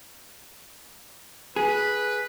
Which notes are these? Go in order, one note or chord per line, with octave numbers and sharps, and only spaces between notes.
G#4 B4